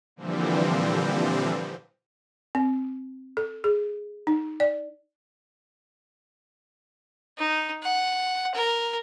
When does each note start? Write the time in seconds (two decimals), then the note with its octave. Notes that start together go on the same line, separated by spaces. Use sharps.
0.16 A#2 D3 E3 F3 G3 C4
2.55 C4
3.37 A4
3.64 G#4
4.27 D#4
4.60 D5
7.38 D#4
7.82 F#5
8.54 A#4